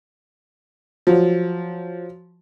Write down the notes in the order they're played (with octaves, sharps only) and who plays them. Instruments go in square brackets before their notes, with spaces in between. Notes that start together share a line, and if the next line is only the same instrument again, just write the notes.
[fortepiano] F3 F#3